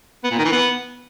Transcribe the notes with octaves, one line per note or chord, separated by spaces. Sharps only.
B3
A#2
D#3
E3
B3